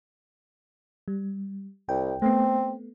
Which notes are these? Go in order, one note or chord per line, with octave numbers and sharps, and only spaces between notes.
G3
C2 G5
A3 B3 C4